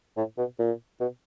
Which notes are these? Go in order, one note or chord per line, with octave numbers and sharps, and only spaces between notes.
A2
B2
A#2
B2